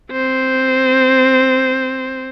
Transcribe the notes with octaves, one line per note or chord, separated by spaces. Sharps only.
C4 C5